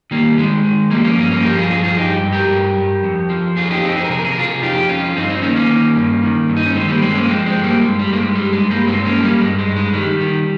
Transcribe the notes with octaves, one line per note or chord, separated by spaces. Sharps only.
D#3 G3 A#3
D#3 G#3
D#3
F3 G3 A#3
A#3 C#4
G2 A#3 C#4
A#3 C#4
F3 G4 A#4
F4 G#4
G2 F4 G#4
F4 G#4
G2 D#4 G4
G2
G4 A#4
G2
G2
F2
F3
F2 F4 G#4
D#4 G4
F2 C4 D#4
G#4
A#4
C3 G#4
A#4
G#4
A#4
C3 F4 G#4
F2 D#4 G4
F2 C#4 F4
G2 C4 D#4
C4 D#4
D#3 A#3 C#4
A#3 C#4
D#3
G2
D#3
G2
D#4
C#4
D#3 G#3 C4
G3 A#3
G2 G#3 C4
A#3 C#4
F3 G#3 C4
G#3 C4
G2
G3 A#3
G2 G#3
G3
G2 A#3
G#3
G2 G3
G#3
G2
G3 A#3
G2 G#3 C4
A#3 C#4
F3
G3 A#3
G2 G#3
G#3
G2
G#3
D#3 G3
D#3